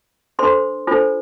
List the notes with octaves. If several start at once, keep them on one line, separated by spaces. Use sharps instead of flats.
D4 A4 C5 C6
D4 F4 A4 C5